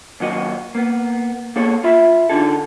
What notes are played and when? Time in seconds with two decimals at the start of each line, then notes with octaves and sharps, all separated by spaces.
0.20 D#2 F#3 F#4 D#5
0.75 A#3 B3
1.56 A#3 B3 G#4 A4 C#5
1.84 F4 E5 B5
2.29 D3 D#4 G#4 A4